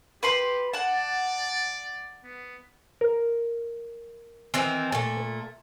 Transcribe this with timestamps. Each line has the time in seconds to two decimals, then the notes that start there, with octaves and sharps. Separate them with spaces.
0.23 G4 B4 B5 C6
0.73 D5 F#5 A5
2.24 B3
3.01 A#4
4.54 D#3 E3 C4
4.92 A#2 A3